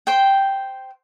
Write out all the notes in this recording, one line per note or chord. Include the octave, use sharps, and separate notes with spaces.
C5 G5